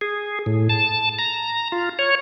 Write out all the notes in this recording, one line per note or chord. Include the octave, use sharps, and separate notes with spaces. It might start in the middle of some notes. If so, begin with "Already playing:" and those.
G#4
A2
A5
A#5
F4
C#5